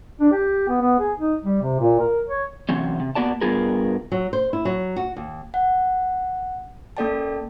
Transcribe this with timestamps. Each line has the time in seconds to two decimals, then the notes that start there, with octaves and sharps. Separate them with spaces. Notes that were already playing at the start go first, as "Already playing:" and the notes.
0.20 D4
0.32 G4
0.68 B3
0.81 B3
0.99 G#4
1.19 D#4
1.45 G3
1.62 C3
1.80 A#2
2.00 A#4
2.28 C#5
2.69 C3 E3 F#3 C4 C#4
3.00 C3
3.15 A#3 B3 F#4 D5 A5
3.41 G2 B3 F4 G#4 A#4
4.12 F#3
4.33 C5
4.53 E4
4.65 F#3
4.96 F#4
5.16 D#2
5.54 F#5
6.97 A#3 C#4 A4 D5 G5 A5